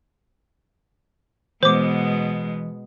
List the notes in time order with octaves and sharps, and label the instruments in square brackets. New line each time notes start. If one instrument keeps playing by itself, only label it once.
[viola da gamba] B2 G#3 B3 [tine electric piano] E3 [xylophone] C5 D6